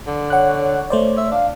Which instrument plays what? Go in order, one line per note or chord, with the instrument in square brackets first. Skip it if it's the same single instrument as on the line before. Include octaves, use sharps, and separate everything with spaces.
[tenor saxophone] D3
[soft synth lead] C#5 [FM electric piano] F#5 F#6
[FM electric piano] A3 C5 D5
[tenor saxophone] E5
[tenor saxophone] D4 [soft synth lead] F5